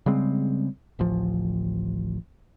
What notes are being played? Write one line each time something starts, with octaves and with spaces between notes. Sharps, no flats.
C#3 G3 G#3 C4
D1 A1 F3